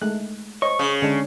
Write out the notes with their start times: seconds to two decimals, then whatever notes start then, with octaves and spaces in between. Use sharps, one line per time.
0.02 G#3 A3 F#6
0.62 C5 C#5 D#5 C#6
0.79 C#3 D#6
1.02 D3 G#3 C#4 D4